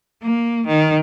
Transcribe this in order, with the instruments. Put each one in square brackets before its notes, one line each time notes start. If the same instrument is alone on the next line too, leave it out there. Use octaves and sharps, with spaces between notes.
[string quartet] A#3
D#3